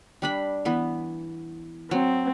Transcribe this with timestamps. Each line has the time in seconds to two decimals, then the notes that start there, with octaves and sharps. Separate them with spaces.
0.22 G3 D4 B5
0.65 E3 B3
1.91 F#3 C4